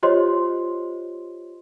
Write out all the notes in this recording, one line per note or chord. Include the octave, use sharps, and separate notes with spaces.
F4 G4 C5 C#5 D#5 C6